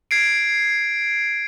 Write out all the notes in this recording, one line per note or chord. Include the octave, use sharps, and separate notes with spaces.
G#6 C7 D7